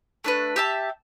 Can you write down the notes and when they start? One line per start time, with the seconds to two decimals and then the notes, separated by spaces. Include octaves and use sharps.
0.24 A3 D4 B4
0.56 G4 E5 A5